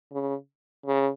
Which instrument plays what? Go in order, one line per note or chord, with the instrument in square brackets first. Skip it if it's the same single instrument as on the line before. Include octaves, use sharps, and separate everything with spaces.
[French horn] C#3
C#3